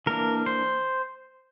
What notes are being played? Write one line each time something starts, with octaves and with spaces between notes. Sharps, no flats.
E3 A#3 D4 A#4
C5